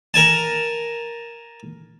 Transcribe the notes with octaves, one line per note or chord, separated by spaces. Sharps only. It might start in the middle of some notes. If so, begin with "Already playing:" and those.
A#4 G#5 A5